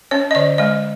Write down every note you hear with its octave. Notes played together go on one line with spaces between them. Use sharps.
C#4 C#5
D#5
D3 D5
G#3 D#5